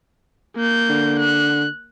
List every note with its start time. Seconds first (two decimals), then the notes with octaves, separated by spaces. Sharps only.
0.56 A#3 G6
0.89 D3
1.19 F#6